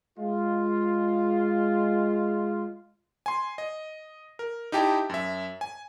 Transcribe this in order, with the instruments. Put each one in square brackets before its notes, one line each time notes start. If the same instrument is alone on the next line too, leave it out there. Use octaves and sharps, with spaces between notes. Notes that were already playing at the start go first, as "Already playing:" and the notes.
[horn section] G#3 F4
[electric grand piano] G#5 C6
D#5
A#4
D#4 E4 G4 G5 A5
F#2 E5
G#5